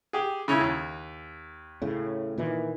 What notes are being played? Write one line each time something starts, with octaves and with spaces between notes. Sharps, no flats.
G4 G#4
C#3 C#4 E4
D#2
A2 C#3
A#2 D#3 E3